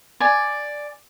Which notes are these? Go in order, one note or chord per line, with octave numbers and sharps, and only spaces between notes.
D5 G#5